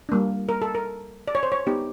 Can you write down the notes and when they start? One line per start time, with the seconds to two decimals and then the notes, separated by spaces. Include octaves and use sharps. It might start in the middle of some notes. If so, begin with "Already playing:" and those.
0.09 G3 A#3 D4
0.49 A#4
0.62 A4
0.75 A#4
1.28 D5
1.35 C#5
1.43 C5
1.52 C#5
1.67 B3 D#4 G4